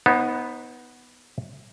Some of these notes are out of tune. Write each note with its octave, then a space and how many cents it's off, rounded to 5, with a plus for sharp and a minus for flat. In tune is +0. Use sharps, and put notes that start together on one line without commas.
B3 +0 D#4 +15 C5 +45